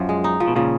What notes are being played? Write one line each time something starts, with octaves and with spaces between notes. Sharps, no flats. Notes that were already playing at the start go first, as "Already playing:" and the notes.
Already playing: F#2 F3
G#3
D#4
F3
B2
A#2 C#3 F3